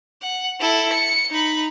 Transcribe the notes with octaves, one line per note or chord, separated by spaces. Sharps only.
F#5
E4 A4
C#7
D#4 B5